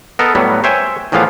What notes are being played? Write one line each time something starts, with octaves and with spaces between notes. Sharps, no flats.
B3 A4 A#4 D#5
A2 F#3 G3 B3
C5 C#5 E5 G5 G#5
E2 A2 E3 F3 B3 F5